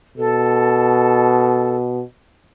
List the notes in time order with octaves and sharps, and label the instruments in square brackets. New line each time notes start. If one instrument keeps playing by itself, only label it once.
[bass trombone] B2 [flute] A4